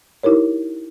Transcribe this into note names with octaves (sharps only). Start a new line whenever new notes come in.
D#4 E4 G4 A#4 C#5